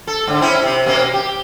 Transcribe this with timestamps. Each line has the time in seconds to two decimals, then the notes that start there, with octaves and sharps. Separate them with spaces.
0.07 A4
0.27 G#2 D3
0.41 C4 C#4 E4
0.63 C3
0.86 B2 A#3 C#4
1.13 G4